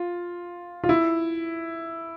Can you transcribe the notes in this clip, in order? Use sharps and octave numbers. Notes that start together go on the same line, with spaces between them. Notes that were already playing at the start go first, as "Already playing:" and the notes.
Already playing: F4
F4
E4